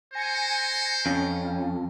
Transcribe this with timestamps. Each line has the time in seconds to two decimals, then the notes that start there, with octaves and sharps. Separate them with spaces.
0.14 C5 G#5 A#6 C#7
1.06 F2 C#4